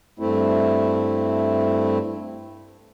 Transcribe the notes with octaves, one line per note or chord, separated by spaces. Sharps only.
G2 A3 C4 E4